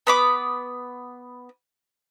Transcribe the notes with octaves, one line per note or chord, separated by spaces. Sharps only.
B3 B5 D6